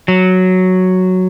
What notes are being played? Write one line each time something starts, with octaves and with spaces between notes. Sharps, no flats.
F#3